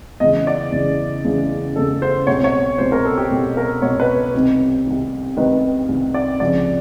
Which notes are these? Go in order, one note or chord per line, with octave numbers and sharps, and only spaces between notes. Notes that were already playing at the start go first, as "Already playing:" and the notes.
E2 C#3 E3 D#5
D5
E2 C#3 E3
E2 C#3 E3
E2 C#3 E3 A4
C5
C2 B2 C#5
C#5
C2 B2 C5
A#4
A4
G4
C2 B2
A#4
C2 B2 C#5
B4
C2 C3 D#3
C2 C3 D#3
C2 C3 D#3 B4
C2 C3 D#3
D5
C#2 C3 F3 D5